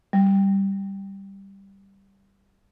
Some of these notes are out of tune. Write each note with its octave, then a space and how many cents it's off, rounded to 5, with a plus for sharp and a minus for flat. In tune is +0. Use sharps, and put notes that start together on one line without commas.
G3 +0